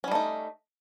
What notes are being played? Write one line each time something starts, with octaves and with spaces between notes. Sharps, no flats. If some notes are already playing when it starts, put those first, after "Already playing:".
G3 A3 C#4 D#4